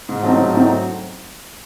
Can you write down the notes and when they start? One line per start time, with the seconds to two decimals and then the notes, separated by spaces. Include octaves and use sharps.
0.09 G#2
0.23 F#3 A3 C4 D#4
0.38 G#2
0.54 F#3 A3 C4 D#4